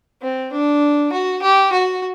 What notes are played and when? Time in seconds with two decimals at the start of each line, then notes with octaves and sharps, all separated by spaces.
0.22 C4
0.52 D4
1.12 F#4
1.42 G4
1.72 F#4